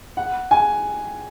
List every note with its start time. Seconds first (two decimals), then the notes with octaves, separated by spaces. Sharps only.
0.17 F#5
0.51 G#5